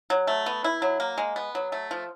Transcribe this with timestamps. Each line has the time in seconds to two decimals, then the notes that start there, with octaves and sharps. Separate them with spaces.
0.10 F#3
0.27 A3
0.46 B3
0.64 E4
0.82 F#3
1.00 A#3
1.18 G#3
1.36 B3
1.55 F#3
1.72 A3
1.91 F3